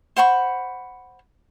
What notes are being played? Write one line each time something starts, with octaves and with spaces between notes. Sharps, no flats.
C5 F#5 B5 C#6